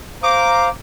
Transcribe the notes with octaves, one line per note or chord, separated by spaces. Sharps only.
C5 F5 A#5 D6